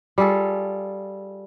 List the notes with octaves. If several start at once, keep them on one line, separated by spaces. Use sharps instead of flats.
G3 F4 G#4 A4